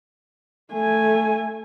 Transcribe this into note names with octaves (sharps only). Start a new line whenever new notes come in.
A3 G#5